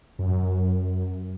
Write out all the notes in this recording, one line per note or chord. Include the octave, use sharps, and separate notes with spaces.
F#2